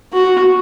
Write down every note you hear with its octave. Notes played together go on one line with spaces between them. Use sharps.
F#4